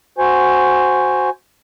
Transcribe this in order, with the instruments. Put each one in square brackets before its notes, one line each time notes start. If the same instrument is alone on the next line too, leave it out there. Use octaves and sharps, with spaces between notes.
[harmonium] F#4 C5 G#5